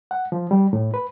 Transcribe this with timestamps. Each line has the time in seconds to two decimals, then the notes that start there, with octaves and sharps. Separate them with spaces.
0.11 F#5
0.32 F3
0.51 G3
0.73 A2
0.94 B4